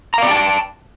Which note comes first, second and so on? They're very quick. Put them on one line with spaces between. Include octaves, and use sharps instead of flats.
A#5 F5 D5 G5 A5